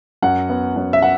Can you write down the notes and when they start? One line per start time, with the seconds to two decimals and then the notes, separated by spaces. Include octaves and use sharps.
0.22 F#2 F#5
0.49 B3
0.76 F#2
0.93 E5
1.02 F#5